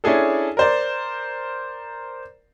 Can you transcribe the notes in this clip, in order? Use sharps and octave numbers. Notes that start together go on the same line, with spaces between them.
C#4 D4 E4 G#4 A4
A#4 C5 D5